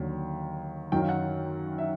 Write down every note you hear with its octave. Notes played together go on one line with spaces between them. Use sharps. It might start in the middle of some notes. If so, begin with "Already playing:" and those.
Already playing: D#2 D3 F#3
F#2 D#3 F#3 G5
F5
F#5
E5